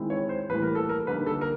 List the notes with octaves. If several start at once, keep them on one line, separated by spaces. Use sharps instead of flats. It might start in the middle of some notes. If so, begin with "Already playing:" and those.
Already playing: D#3 G#3 C4 E4
C#5
C5
A2 E3 G3 A#3 B4
A#4
A4
A#4
D3 G3 A#3 D#4 B4
A4
A#4